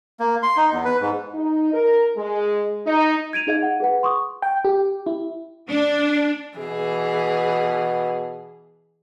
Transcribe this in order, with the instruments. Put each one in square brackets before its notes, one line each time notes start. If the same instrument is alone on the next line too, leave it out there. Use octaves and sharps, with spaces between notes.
[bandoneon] A#3
C6
D#4
E2
B4
G#2
[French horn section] D#4
A#4
G#3
D#4
[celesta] G#6 D7 D#7 F7
D#4 G#4 D#5 F5 G#6
F#5
G#4 B4 F#5
C6 C#6 D#6
[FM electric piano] G5
G4
E4
[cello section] D4
[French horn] B2 [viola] E3 G#4